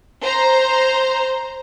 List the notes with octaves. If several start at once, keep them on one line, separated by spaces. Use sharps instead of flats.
C5 A#5